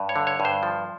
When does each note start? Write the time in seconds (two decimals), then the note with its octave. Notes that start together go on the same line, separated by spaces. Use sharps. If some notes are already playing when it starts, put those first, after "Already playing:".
Already playing: G2
0.09 C#5
0.16 D3
0.27 C#5
0.40 G2
0.45 C5
0.63 F3